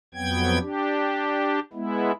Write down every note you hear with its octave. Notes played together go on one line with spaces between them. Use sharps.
F2 F#3 B3 G5 G#6
D4 G4
G#3 B3 E4